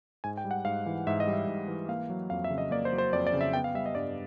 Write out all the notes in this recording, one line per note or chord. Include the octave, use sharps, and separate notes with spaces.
G#2 G#5
G5
G3
F#5
G#2 F5
E3
G#2 E5
D#5
G3
E5
G#2
E3
A#3 F5
F#3
F2 F5
E5
C#3
D#5
A#3 D5
C5
F#3
C5
F2 D5
D5
C#3
E5
B3 G5
F5
G3 E5
D#5
G2 D5